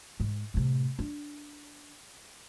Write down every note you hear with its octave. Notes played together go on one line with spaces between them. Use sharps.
G#2
A2 C3
D4